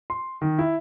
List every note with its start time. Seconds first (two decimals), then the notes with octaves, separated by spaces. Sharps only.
0.10 C6
0.42 D#3
0.59 E4